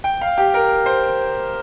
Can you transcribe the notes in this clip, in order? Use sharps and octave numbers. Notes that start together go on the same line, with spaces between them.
G5
F5
G4
A#4
C5